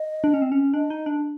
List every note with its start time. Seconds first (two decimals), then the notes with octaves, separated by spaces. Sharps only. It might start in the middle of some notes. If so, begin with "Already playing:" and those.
Already playing: D#5
0.24 D4
0.34 C#4
0.42 C4
0.52 C#4
0.73 D4 D#5
0.90 D#4
1.06 D4